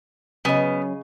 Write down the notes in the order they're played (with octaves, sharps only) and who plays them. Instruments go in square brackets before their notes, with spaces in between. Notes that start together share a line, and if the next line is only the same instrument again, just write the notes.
[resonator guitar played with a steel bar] C#3 D#5 [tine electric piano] F#3 C#4 [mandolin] B3